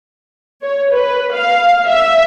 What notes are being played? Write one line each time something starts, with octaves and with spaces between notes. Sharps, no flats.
C#5
B4
F5
E5